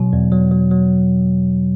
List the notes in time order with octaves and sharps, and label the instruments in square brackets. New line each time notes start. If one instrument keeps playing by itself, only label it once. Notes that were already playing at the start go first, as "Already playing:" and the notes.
Already playing: [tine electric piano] B2 F#3
E2
F#3
F#3
F#3